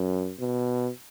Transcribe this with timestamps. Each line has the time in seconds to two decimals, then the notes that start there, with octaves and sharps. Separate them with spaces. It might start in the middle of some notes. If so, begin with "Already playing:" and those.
Already playing: F#2
0.39 B2